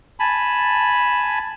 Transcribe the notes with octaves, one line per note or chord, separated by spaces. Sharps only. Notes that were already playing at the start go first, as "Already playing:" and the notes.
G#5 A5 B5